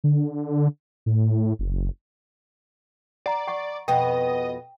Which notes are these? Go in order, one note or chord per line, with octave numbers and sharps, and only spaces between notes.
D3
A2
F#1
D5 F#5 A#5
F#5 C#6
F2 B2 B3 D#5 G5